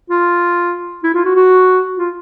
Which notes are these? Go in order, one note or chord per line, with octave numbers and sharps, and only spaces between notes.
F4
E4
F4
F#4
F#4
F4